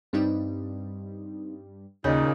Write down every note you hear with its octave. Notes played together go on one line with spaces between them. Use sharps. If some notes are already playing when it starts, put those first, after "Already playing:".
G2 G3 C4 D#4
D#2 A#2 C#3 D#4 G6